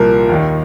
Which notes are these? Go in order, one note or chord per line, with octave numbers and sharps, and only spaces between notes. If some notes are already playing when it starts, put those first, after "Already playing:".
Already playing: C2 A#2 F3 A#4
D#2 D#3